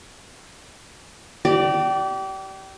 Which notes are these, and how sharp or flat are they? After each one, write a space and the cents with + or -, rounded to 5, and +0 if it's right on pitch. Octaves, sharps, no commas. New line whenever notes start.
G4 -30 D5 +0